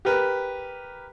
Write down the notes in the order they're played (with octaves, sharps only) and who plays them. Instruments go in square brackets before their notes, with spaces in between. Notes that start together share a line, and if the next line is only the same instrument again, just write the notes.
[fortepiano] G4 A#4 B4